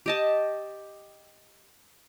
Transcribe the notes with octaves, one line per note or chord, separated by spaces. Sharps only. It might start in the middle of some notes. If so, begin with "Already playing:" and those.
G4 D#5 A5